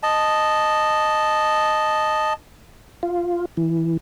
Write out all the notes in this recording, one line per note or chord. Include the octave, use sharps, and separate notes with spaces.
D#5 A5
F4
E3